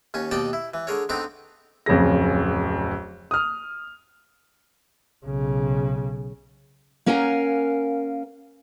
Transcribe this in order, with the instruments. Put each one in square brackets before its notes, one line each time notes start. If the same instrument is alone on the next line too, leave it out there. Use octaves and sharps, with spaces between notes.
[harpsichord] D#2 C#4 G#5
D#2 B2 D5 D#5 G5 A5
E4
E3
D3 G#4 A#4 C#5
D3 B3 C4 D#4 A#5 D6
[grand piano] D1 F2 C#3 G#4 A#6
D#6 F6
[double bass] B1 C#3
[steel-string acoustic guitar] A#3 C#4 A#4 F5 F#5 G#5